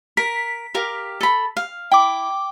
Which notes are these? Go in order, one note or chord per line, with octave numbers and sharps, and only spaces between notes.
A#4 B6
G4 A#4 F5
A4 B5
F5
E4 G5 D6